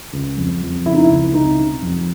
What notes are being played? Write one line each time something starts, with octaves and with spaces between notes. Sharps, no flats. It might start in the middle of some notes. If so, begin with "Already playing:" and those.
C#2
F2
F2
C#3 E4
D#4
E4
C#2
C3 D#4
C3
F2